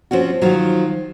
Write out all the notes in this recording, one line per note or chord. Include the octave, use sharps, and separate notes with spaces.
F3 C4 C#4 F#4
D#3 F3 F#3